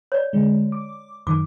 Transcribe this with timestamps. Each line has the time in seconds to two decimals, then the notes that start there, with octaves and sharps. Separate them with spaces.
0.12 C#5 D5
0.33 D3 G#3
0.72 D6
1.27 F#2 D#3 D6